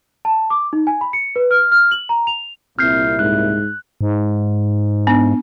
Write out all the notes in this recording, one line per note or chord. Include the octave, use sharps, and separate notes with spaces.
A5
D6
D#4
G#5
B5
C#7
B4
F6
F6
F#7
A#5
F7
C2 A#2 C4 E4 F6 G6 C7
G#2 F#6
G#2
B3 D4